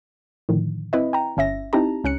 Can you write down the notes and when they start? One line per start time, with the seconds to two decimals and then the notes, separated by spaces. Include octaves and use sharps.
0.49 A2 D3 D#3 F3
0.93 C4 E4 B4 D#5
1.13 G5 A#5
1.37 G1 C#4 E5 A#6
1.73 C4 D#4 E4 G4 A5 A#5
2.04 C#2 C#4 F#6 C#7